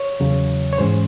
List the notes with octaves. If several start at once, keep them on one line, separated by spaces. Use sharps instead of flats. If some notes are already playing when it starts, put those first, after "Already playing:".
Already playing: C#5
E2 C#3 F#3
C#5
G#2 E3 G#3 C#4 C5